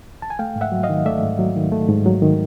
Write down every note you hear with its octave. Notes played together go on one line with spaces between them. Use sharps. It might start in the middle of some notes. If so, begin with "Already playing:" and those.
A5
G#5
A3 F5 G5
G#2
E5 F#5
F#3
D#5 F5
D#3
A3 D5 E5
G#2
F#3
D#3
A3
G#2
F#3
D#3